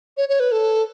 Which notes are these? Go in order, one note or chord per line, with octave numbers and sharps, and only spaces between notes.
C#5
C#5
B4
A4